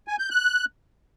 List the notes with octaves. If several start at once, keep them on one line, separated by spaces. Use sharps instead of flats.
G#5
G6
F#6